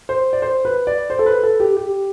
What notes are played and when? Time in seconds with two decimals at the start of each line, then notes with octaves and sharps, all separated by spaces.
0.09 C5
0.33 D5
0.42 C5
0.65 B4
0.87 D5
1.10 C5
1.19 A4
1.26 B4
1.43 A4
1.60 G4
1.77 G4